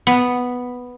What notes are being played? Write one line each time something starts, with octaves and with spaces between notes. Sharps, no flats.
B3